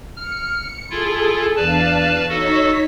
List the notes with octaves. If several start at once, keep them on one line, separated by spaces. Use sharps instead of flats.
F6 C#7
E4 F4 G#4 A4
E2 D4 B4 D5 F5 A5
D#4 F#4 A4 C#5 B6